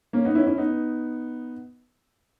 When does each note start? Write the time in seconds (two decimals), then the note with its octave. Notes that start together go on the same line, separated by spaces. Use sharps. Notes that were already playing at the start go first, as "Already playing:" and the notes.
0.13 A#3 C#4
0.25 B3 D#4
0.35 C#4 E4
0.47 C#4 E4
0.58 B3 D#4